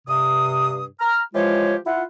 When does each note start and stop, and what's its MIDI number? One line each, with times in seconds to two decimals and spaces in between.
0.07 0.84 43
0.07 0.84 48
0.07 0.84 87
1.00 1.21 82
1.00 1.21 89
1.34 1.76 52
1.34 1.76 53
1.34 1.76 56
1.34 1.76 65
1.34 1.76 67
1.34 1.76 73
1.86 2.03 64
1.86 2.03 65
1.86 2.03 78